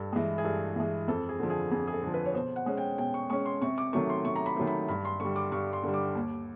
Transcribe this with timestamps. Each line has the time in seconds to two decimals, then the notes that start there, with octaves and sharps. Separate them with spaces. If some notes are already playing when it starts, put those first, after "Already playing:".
Already playing: G2 A4
0.12 E3 G#3
0.38 G#4
0.44 G2 A4
0.76 E3 G#3
1.08 F2 A4
1.29 G#4
1.40 D3 F3
1.50 G#4
1.71 F2 G#4
1.87 G#4
1.93 A4
2.03 D3 F3
2.14 B4
2.25 C#5
2.34 B2 C5
2.56 F#5
2.66 G#3 C#4
2.77 G5
2.98 B2 G5
3.14 C#6
3.30 G#3 C#4 C#6
3.46 C6
3.62 C3 C#6
3.78 D6
3.93 D#3 F#3 A3 C#6
4.09 C6
4.25 C3 C#6
4.36 A#5
4.46 B5
4.57 D#3 F#3 A3
4.67 B5
4.88 G2 B5
5.05 C6
5.20 D3 G3 C#6
5.36 D6
5.52 G2 C#6
5.73 C6
5.83 D3 G3
5.94 D6
6.15 D#2